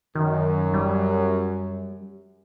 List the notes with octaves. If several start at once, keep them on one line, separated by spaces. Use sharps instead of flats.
F#2 D#3
G3